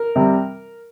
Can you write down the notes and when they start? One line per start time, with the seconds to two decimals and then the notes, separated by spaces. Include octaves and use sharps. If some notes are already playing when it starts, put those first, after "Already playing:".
Already playing: A#4
0.16 C3 G3